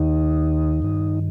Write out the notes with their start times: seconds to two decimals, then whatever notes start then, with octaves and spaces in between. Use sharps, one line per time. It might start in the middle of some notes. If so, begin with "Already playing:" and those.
Already playing: D#2 D#3 D#4
0.82 G2 D#3